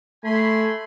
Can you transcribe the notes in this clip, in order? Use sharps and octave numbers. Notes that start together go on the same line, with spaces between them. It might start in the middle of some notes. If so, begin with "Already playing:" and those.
A3 G#5 B5 C6